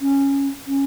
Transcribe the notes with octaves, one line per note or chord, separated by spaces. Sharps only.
C#4
C#4